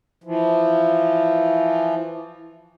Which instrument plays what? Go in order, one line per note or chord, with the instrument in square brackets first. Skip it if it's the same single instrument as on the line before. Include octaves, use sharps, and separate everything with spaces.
[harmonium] E3 F3